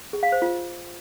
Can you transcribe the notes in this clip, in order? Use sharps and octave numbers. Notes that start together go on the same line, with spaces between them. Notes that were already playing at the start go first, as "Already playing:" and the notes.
G#4
F5
C5
F4